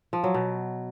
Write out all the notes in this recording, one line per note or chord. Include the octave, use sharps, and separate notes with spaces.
F3
F#3
B2